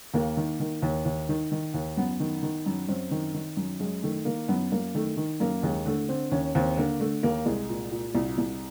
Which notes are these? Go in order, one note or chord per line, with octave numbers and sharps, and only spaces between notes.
D#2 A#3
D#3
D#3
D#2
D#2
D#3
D#3
D#2
F#2 B3
D#3
D#3
F#2
F#2 C4
D#3
D#3
F#2
F#2 G#3
D#3 A3
D#3 A#3
F#2 B3
F#2 A#3
D#3 A3
D#3
F#2 A#3
D#2 G#3
D3 A3
D3 C4
D#2 C#4
D#2 C4
D3 A#3
D3 A3
D#2 A#3
C2 G#3
A#2
A#2
C2
C2